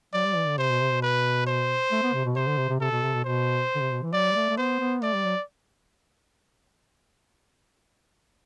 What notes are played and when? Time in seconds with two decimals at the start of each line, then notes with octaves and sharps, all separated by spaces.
0.14 F#3 D5
0.25 G3
0.36 E3
0.47 D3
0.58 C3 C5
0.69 B2
0.81 C3
0.92 B2
1.02 B4
1.47 C5
1.92 A3
2.03 B3
2.14 C3
2.25 B2
2.36 C3 C5
2.48 D3
2.58 C3
2.69 C3
2.80 C3 A4
2.91 B2
3.03 C3
3.14 B2
3.24 B2 C5
3.75 D3
3.81 C3
3.91 B2
4.02 E3
4.13 F#3 D5
4.31 G3
4.35 A3
4.50 A3
4.57 B3 C5
4.80 B3
5.02 A3 D5
5.14 G3
5.25 F#3